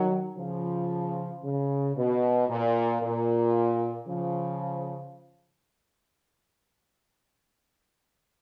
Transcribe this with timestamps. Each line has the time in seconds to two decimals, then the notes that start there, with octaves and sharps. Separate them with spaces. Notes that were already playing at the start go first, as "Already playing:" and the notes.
Already playing: D#3 F#3
0.37 C#3 F3
1.43 C#3
1.96 B2
2.48 A#2
3.02 A#2
4.07 C#3 F3